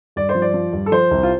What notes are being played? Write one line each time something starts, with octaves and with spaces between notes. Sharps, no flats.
G2 D5
C5
F3
D5
F3
G2
A4
F3 C5
C2
F4